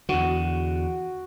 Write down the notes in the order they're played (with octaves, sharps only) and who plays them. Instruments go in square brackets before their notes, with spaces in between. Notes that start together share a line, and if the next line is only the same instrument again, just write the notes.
[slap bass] E2 D3 [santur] F#4